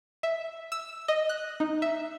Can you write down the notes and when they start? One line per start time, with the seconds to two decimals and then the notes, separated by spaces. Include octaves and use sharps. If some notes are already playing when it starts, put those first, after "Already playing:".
0.23 E5
0.72 E6
1.08 D#5
1.29 F#6
1.60 D#4
1.82 E5